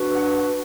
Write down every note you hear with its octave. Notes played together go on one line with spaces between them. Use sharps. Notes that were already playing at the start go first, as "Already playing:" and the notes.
Already playing: D4 F#4 B4
F#5